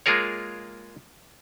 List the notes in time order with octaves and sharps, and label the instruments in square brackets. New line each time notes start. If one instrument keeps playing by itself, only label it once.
[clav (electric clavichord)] G#3 A#3 F4 G#4 A#4 C#5